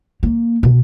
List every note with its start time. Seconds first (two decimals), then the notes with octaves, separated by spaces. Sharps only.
0.23 A#3
0.63 B2